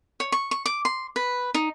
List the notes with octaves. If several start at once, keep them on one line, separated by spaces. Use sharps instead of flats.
C#5
C#6
C#6
D6
C6
B4
D#4